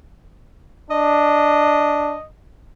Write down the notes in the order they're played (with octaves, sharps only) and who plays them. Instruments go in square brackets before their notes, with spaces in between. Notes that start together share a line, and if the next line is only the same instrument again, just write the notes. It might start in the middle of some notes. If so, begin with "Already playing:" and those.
[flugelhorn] D4 [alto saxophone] D#5